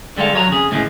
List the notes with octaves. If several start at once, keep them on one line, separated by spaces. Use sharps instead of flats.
D3 G3 G#3 A4 F5
F3 F#3 C#5 A5 A#5
F2 C#3 G#4
A2 C#3 E3 F3 G#3